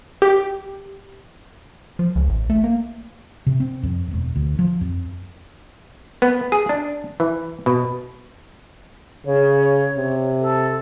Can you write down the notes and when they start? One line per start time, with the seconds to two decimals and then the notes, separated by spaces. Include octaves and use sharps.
0.22 G4
1.99 F3
2.16 C#2
2.29 A1
2.50 A3
2.64 A#3
3.47 C3
3.60 C4
3.83 F2
4.11 E1
4.36 D2
4.59 F3
4.81 F2
6.22 B3
6.52 G#4
6.69 D4
7.20 E3
7.66 B2
9.26 C#3 C#5
9.96 C3
10.41 A4